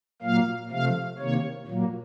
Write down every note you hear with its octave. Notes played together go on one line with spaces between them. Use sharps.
A#2 F#3 A#3 F5
C3 F3 A3 F5
C3 D#3 A#3 C#5
A#2 F#3 A#3